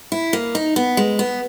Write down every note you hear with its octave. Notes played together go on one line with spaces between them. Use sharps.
E4
A#3
D#4
B3
G#3
B3